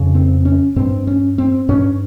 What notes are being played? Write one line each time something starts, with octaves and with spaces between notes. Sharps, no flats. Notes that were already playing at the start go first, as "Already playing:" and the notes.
Already playing: F2 C#3
C4
C#4
G2 C4
C#4
C4
G2 C#4